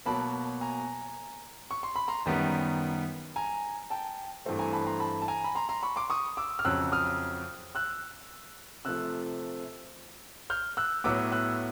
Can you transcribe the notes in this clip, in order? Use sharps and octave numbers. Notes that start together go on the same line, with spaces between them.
B2 F#3 A#3 A5 B5
G#5 A#5
C#6
C6
B5
A#5 C6
F#2 D#3 G3 B3
G#5 A#5
G5 A5
G2 E3 A3 C4
G#5 A#5
A5 B5
A#5 C6
A5 B5
A5
G#5 A#5
B5
A#5 C6
A#5 C6
B5 C#6
C6 D6
C#6 D#6
D6 E6
F6
F2 C#3 F#3 E6 F#6
D#6 F6
E6 F#6
C3 F3 A3 E6 F#6
F6 G6
E6 F#6
A2 F#3 B3 D6 E6
E6 F#6